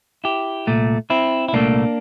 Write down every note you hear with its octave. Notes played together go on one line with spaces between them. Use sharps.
E4 G4
C2 A#2 A3
C4 E4
E4
C2 A#2 A3 A#3 D4